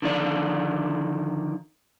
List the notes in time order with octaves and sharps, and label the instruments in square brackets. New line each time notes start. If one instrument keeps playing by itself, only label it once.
[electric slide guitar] D3 D#3 F3 D5